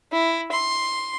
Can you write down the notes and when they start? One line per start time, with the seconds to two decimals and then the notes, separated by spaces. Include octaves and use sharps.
0.13 E4
0.52 C6